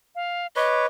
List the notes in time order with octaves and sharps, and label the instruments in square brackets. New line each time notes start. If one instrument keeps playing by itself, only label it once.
[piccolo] F5
[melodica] B4 C#5 [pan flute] D#5 [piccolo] D6